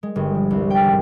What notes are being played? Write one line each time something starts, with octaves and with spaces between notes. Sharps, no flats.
G#3
G1
F3
C2
G5
G#1